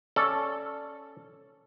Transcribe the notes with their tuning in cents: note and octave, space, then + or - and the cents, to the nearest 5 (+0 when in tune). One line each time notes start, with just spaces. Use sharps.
C#4 +0 A4 +0 D5 +0